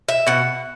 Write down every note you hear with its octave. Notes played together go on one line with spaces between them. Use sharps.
E5
B2 F#5